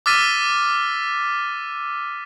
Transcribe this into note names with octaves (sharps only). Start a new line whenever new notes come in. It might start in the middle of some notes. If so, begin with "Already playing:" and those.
D6 E6 F6 A6 B6 D#7